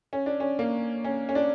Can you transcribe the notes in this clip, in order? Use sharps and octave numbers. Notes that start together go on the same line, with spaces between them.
C#4
D4
C#4
A#3
C#4
C#4
D4